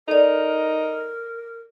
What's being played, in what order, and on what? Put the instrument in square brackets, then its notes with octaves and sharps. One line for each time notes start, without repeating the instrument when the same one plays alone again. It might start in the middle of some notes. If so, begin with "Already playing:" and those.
[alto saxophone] D#4 [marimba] A4 D5 [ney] A#4